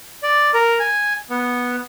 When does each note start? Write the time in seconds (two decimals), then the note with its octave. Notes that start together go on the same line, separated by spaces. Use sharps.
0.23 D5
0.54 A#4
0.79 G#5
1.30 B3